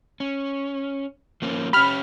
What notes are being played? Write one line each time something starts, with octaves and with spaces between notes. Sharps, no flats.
C#4
F3 A#3 C#4
C#4 G4 B5 F6